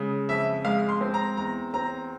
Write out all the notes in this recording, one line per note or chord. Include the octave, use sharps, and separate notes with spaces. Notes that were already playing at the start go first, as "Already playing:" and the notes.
Already playing: C#3 G#3
F2 E5
G#3 F5
C6
C4
A#5
E2 A#5
C4 A#5